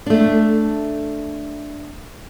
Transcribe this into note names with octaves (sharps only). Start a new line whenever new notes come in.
A3 D4